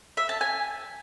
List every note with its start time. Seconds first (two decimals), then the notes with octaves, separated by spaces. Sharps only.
0.17 E5
0.29 A5
0.41 G#5